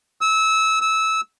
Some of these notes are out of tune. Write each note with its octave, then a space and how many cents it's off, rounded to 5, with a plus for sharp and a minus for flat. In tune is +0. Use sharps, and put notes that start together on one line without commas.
E6 -25
E6 -20